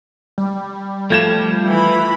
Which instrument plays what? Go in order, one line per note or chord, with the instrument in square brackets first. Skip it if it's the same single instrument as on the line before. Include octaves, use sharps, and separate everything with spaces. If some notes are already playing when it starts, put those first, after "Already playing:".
[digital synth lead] G3
[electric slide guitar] F3 [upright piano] A3 G#6 E7
[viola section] E3 B5